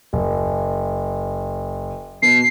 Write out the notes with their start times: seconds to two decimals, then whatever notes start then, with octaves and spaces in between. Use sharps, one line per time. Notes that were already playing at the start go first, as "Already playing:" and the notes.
0.13 F#1
2.22 B2 C7